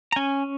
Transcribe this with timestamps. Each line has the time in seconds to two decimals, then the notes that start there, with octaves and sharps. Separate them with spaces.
0.12 A#5
0.16 C#4 G#5